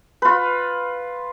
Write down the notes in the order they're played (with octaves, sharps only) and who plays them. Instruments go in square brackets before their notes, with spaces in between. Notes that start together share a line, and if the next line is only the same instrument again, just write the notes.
[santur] F4 B4